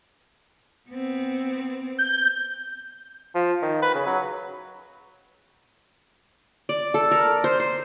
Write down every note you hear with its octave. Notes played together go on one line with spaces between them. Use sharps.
B3 C4
G6
F3
D#3
B4
C#3
F#3
D5
A4
A#4
C5
C5